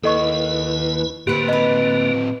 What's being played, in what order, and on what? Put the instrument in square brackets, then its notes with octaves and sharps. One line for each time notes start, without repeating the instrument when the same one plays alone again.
[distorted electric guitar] D#2 [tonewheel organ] E4 B4 [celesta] A4 D#5 C#6
[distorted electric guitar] A2 C4 [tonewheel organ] D3 A#3 [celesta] G4 [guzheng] B4 F#5
[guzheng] B4 B5 [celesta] D#5